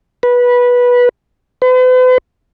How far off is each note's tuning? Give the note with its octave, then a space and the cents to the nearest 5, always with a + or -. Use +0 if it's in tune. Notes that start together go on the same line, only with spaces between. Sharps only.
B4 -15
B4 +45